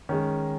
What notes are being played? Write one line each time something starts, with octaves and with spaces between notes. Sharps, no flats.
D#3 G#3 C#4